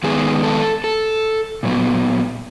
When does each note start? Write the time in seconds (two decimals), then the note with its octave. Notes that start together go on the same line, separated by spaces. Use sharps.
0.04 D#3 G#3 B3 G#4
0.43 A4
0.84 A4
1.63 A#2 F#3 B3